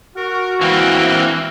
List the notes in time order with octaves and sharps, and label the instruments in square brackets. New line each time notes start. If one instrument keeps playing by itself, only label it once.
[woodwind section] F#4 [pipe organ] A#4
[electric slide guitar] E3 [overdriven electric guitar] A#3 C4 [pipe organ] G5 F6 F#6